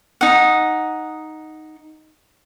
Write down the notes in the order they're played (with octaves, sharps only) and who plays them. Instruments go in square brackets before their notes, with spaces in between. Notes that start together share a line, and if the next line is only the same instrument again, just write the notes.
[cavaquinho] D#4 F#5